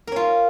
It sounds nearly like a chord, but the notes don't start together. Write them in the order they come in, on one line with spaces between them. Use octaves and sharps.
A#4 C#4 F4